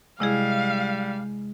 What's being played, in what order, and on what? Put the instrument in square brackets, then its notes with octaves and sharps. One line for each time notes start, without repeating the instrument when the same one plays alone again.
[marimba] C3 E4 G#4 [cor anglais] G3 [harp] G#3 [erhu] F5